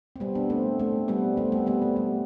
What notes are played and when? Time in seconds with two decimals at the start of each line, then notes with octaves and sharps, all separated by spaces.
0.16 C4
0.20 G3 B3
0.35 B3 D4
0.50 A3 C4
0.79 A3 C4
1.08 G3 B3
1.37 A3 C4
1.52 G3 B3
1.67 G3 B3
1.82 A3
1.96 G3